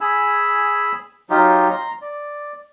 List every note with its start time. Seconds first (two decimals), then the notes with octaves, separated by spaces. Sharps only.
0.01 G#4 G#5 B5 E6
1.30 F#3 D#4 F4 G4
1.70 A#5 C6
2.01 D5